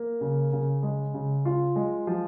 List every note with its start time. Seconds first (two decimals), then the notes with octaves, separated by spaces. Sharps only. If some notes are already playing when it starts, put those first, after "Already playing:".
Already playing: A#3
0.21 C#3
0.53 C#3
0.83 G#3
1.14 C#3
1.45 F4
1.76 G#3
2.07 F3